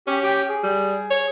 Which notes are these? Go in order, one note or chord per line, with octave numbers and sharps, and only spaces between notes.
C#4 G4
G4 G5
G#4
G3
C#5